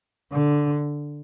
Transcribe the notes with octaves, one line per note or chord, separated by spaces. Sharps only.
D3